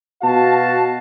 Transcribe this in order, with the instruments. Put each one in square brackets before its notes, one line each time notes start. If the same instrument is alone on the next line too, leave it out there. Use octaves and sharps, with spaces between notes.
[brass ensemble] B2 F#4 F5 A5